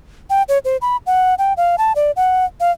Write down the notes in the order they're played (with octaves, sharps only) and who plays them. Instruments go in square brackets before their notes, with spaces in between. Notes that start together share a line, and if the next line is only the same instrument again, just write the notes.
[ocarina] G5
C#5
C5
B5
F#5
G5
F5
A5
D5
F#5
F5